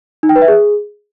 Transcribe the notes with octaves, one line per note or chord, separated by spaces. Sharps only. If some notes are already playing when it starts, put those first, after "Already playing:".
D#4
G5
B4
E5
G#4